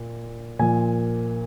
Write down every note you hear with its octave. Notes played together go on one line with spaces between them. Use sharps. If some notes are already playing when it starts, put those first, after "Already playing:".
Already playing: A#2
A#2 F3 A#3 G#5